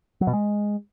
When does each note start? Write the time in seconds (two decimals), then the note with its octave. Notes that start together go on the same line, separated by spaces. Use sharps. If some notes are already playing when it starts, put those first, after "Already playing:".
0.21 F#3
0.27 B2
0.33 G#3